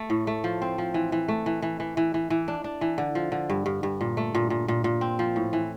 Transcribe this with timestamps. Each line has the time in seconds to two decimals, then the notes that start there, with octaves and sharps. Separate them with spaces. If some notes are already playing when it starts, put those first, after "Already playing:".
Already playing: A3
0.10 A2
0.27 A3
0.44 F3
0.62 C4
0.78 F3
0.94 E3
1.12 E3
1.28 A3
1.46 E3
1.62 E3
1.80 E3
1.97 E3
2.14 E3
2.30 E3
2.48 D4
2.64 D4
2.81 E3
2.98 D3
3.15 F3
3.32 D3
3.50 G2
3.66 G2
3.83 G2
4.01 A#2
4.17 A3
4.35 A#2
4.50 A#2
4.68 A#2
4.84 A#2
5.01 C4
5.19 F3
5.36 A2
5.53 E3